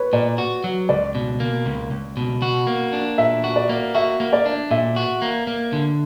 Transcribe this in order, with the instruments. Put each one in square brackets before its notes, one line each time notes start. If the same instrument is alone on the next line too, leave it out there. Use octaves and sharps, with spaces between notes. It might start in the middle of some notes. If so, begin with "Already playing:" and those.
Already playing: [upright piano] B4 C#5
[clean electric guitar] A#2 [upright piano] D5
[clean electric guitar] F#4
F#3
[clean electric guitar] C#2 [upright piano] D5
[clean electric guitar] B2
A#3
C#2
C#2
B2
F#4
A#3
D4
[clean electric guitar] A#2 [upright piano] E5
[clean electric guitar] F#4
[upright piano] D5
[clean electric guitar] A#3
[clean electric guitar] F#4 [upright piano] E5
[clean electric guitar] A#3
[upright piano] D5
[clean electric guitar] D4
[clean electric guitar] A#2 [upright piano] E5
[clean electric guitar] F#4
A#3
A#3
D3